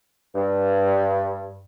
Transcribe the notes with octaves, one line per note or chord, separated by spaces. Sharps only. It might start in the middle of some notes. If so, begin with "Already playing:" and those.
G2